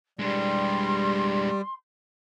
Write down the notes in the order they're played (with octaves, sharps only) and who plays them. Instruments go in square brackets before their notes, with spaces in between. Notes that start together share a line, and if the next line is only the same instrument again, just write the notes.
[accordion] G3 [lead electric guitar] G#3 D4 [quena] C6